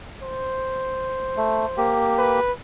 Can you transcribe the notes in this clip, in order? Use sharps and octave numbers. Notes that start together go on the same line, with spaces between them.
C5
A3
A#3 G4
B4